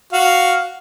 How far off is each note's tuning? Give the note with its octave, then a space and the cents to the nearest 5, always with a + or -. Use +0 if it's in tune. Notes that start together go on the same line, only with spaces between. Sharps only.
F#4 +0 F5 +0